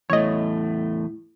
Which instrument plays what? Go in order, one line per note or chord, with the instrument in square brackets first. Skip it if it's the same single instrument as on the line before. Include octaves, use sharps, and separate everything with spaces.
[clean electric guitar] E2 A2 A3 [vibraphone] E4 [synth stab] C#5 D#5